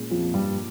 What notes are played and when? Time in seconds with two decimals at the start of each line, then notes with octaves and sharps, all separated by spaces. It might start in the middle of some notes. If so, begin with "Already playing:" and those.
Already playing: A#2 G#3 C#4 G#4
0.11 F2 F3
0.33 G2 G3